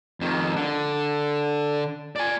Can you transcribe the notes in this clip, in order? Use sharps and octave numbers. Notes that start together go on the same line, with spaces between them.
F2 D#3
D3
D5 G#5